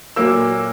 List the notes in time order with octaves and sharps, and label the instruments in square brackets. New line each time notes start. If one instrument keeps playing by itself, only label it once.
[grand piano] A#2 F#3 A#3 E6